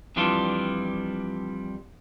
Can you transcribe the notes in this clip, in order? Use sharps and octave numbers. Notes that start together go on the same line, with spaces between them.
F2 E3 G3 D4 F4